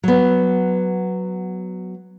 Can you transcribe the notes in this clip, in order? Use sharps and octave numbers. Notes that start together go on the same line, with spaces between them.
F#3 B3